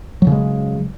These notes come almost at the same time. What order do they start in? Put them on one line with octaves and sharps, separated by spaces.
F#3 C#3 G#3